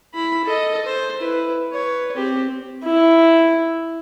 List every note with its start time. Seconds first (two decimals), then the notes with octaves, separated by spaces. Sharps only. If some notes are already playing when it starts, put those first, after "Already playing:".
0.14 E4 B5
0.45 A4 D#5
0.85 C5
1.18 E4 B4
1.72 B4 C#5
2.15 C4 G4
2.85 E4